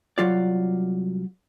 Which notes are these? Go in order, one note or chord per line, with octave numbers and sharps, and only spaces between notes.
C2 C3 F#3 F4 D5